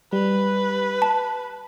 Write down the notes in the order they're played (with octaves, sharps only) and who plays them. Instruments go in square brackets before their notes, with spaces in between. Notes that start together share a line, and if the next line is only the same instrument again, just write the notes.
[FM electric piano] G3 [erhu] B4
[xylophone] A5